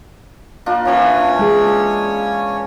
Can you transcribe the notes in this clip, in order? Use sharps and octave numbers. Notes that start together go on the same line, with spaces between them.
A#3 D4 F4
E3 C#4 D4 F4 C#5
G#3 G#4